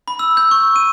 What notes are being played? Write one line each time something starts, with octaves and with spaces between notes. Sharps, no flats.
B5
E6
G6
C#6
D#7